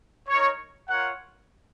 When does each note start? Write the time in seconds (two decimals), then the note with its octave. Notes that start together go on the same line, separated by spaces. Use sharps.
0.29 D#4 A#4 C#5
0.88 F4 A#4 C#5 F#5